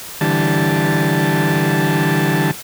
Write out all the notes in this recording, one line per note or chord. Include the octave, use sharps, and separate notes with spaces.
D3 E3 G3 A5